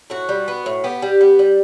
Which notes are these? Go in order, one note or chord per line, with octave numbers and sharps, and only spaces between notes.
A2 F#4
G3
B3
A2
B3 G4
G3
B3
G3